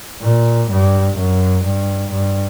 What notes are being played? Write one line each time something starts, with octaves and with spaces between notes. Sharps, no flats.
A#2
G2
F#2
G2
G2